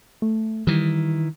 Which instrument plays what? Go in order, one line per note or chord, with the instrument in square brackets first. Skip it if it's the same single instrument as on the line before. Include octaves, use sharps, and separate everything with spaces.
[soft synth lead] A3
[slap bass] D#3 E3 [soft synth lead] G3